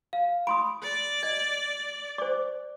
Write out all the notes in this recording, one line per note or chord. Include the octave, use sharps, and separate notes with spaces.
F5
B5 C6 D#6 D7
D5
D#5 G#6
C5 D5 D6